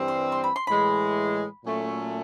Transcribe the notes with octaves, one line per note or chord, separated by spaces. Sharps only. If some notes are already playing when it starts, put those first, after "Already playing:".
Already playing: G2 E3 G3 C4
C6
C6
B5
C6
A2 E3 G#3 B5
A#2 F#3 A3 C#4